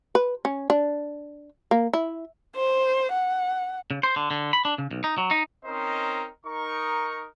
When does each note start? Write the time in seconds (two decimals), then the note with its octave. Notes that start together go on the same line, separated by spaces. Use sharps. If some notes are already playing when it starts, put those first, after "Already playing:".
0.15 B4
0.45 C#4
0.70 D4
1.71 A#3
1.93 E4
2.55 C5
3.12 F#5
3.91 C#3
4.03 C5
4.16 D3
4.31 D3
4.53 B5
4.65 D4
4.78 C#3
4.91 B1
5.04 D#4
5.18 F#3
5.31 D#4
5.65 C4 C#4 D#4 A#4 C5 D#5
6.46 D#4 A#4 C#6